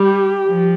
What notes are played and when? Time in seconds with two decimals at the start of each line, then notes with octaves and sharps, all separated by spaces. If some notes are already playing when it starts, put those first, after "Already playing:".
Already playing: G3 G4
0.46 F3